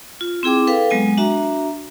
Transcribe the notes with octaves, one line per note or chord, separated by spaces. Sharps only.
F4
C4 E4 G#4 G5 D6
A4 B4 F5 G5
F#3 G#3 B3 G#5
D4 F#4 E5 A#5